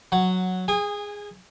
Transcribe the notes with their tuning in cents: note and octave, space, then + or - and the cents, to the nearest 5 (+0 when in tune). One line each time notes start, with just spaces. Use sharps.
F#3 -5 F#5 +0
G#4 -10 G#5 -35